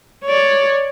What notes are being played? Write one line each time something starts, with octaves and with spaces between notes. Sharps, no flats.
C#5 D5